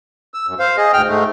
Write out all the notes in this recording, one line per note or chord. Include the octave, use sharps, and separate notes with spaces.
E6
F#2
C5 F5
G#4 D#5
D2 G#2 G5 F6
G#2 G#3 A3